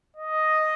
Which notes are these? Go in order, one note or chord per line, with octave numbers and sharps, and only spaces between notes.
D#5